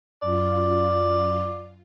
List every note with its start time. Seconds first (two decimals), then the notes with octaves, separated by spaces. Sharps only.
0.22 F#2 F4 D5